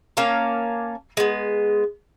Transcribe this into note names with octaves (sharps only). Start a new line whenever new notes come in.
A#3 C#4 F5 A5
G#3 B3